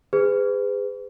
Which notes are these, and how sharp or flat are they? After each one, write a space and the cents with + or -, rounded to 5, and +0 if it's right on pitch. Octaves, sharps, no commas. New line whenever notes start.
G#4 -25 B4 +35